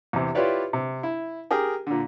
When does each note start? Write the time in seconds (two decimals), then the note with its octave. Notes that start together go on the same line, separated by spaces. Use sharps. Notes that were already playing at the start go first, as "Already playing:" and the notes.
0.13 E2 C3
0.35 E4 F4 G4 B4 C#5 D5
0.73 C3
1.03 E4
1.51 G4 G#4 A#4 G5
1.87 A#2 D3